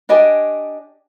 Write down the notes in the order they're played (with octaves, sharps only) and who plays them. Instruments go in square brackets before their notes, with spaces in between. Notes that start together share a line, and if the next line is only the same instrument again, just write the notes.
[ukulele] D4 G4 D#5 G#5